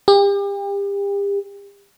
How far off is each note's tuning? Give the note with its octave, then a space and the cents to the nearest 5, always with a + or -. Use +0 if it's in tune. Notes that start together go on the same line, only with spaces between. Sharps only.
G4 +35